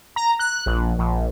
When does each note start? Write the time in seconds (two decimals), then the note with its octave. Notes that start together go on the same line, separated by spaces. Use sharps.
0.16 A#5
0.39 F#6
0.66 A#1
0.99 A#1